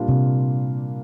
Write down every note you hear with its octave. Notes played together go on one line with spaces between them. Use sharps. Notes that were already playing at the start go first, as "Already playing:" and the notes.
Already playing: A#2 G3 A#3 D4 F4
C3